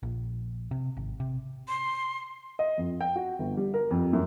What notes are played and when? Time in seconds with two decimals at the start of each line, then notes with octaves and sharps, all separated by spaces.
0.03 A#1
0.71 C3
0.97 G#1
1.20 C3
1.68 C6
2.59 D#5
2.78 F2
3.01 G5
3.16 F#4
3.39 G1
3.57 G3
3.74 A#4
3.91 F2
4.13 F#2